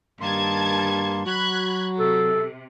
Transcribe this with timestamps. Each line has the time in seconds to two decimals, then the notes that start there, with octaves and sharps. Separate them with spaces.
0.21 G2 D#3 A#3 A5 C6 G#6
1.26 F#3 F#4 B5 F#6 G#6
1.99 C3 A4